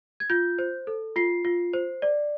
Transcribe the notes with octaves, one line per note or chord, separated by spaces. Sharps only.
G#6
F4 G6
C5
A4
F4 C7
F4
C5
D5